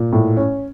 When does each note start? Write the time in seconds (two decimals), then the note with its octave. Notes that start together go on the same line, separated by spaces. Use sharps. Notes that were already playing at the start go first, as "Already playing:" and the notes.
Already playing: A#2
0.12 A2
0.37 C#4